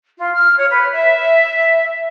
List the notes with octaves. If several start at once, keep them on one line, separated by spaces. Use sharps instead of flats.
F4
F6
C#5
B4
E5